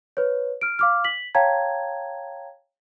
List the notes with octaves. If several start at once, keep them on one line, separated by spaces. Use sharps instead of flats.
B4 C#5
F6 D7
F5 D6 F6
B6 F#7
C#5 F5 G5 A5 A#5 G#6